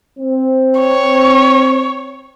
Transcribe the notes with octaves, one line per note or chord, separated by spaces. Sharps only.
C4
C#5